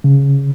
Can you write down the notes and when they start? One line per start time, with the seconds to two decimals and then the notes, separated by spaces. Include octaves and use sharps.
0.04 C#3